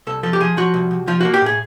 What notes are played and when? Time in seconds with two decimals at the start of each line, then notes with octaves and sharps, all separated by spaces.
0.07 C2 A4
0.23 F3 A4
0.33 G4
0.40 F3 G#4
0.57 F3 F#4
0.74 C2
0.91 C2
1.08 F3 F4
1.21 A#3 F#4
1.34 G4
1.42 A2 G#4